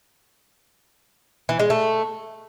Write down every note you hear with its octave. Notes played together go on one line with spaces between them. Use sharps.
E3
G#3
A3